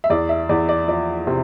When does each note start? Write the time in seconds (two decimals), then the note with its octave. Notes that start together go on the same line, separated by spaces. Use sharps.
0.04 E5
0.10 E2 D5
0.29 E5
0.49 E2 D5
0.69 D5
0.88 F3 D5
1.27 C3